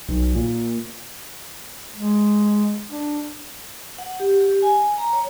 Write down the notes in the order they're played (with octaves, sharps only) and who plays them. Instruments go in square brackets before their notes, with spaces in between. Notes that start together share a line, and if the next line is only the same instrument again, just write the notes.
[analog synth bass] B1
A#2
[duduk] G#3
D4
[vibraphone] F#5
G4
G4
G#5
A#5
C#5